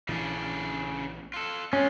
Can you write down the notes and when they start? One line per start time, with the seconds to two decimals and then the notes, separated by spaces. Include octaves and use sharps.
0.09 A#1 C#3 E3 D4
1.34 F4 A4
1.73 G#3 C#4 F4